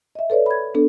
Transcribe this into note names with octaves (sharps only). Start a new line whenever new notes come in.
D#5 E5
A4 B4 C#5 D5
B5 G#6
B3 D4 A4